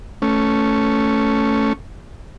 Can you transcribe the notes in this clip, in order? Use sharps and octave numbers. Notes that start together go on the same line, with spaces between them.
A3 C#4